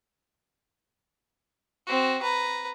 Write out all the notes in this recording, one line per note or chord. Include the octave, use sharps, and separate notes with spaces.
C4 F#4
B4 A#5